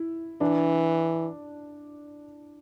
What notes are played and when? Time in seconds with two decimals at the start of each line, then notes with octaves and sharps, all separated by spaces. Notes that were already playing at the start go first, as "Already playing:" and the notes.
Already playing: E4
0.41 E3 D4